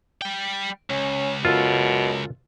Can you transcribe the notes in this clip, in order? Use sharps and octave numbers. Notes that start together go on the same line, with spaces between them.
G3 G5
C#2 C#4
F#2 B2 F4 A4